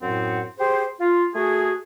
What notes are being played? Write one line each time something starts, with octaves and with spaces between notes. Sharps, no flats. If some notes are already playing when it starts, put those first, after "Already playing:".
F#2 A2 C4 F#5
G4 G#4 C5
F4
A3 F#4 G#4